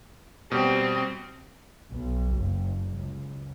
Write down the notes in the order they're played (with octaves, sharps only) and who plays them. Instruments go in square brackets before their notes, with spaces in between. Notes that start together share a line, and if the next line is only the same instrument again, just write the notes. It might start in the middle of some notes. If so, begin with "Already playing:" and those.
[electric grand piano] B2 G3 G4 [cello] C4
[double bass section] B1
F#1
C#2